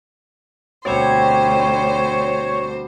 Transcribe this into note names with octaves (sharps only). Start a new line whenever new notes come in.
D2 B2 G3 C4 C5 C#5